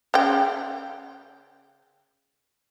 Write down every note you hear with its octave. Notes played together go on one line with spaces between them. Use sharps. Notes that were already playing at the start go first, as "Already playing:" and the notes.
C#3 G5